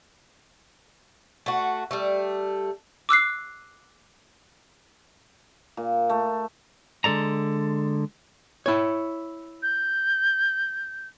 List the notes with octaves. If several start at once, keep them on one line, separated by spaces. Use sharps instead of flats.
A3 F#4
G3 A3
D6 E6 F#6 C7
A#2
A3
D3 G#3 A4 D5 A#5
E4 C#5
G6